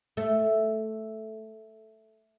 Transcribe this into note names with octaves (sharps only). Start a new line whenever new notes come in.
A3